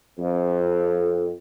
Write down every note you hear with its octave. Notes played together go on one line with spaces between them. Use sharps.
F2